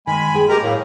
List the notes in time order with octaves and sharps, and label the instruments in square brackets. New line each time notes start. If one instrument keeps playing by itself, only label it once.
[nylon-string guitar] D#3 [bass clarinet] G#3 [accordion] G#5 B5
[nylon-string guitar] G#4 G5
[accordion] G4 A#4 A#5 [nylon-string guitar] A4 D#5
[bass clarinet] A2 [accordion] F#3 A#3